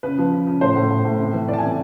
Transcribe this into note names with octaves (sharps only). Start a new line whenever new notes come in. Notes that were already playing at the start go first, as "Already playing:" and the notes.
C#3 B4
F3
C#3
C#3
A2 C5
A2
A2
A2
C3
E3
E3 D5
A5
G#5
C3